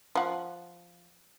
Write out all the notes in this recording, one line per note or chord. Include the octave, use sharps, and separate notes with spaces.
F3 F#5